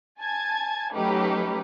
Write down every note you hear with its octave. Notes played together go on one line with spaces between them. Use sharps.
G#5 A5 G#6
F#3 A3 C#4 D#4 G4 B4